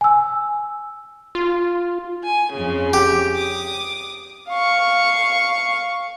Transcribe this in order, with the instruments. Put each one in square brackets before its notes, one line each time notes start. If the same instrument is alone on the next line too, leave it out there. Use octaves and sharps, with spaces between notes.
[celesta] G#5 E6
[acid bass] F4
[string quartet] G#5
F2 C#3
[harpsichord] G4
[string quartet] D6 D#6
[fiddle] F5 C#6